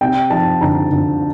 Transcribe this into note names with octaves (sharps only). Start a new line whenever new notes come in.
C3 G5
F3 A5
D2 A#5
D2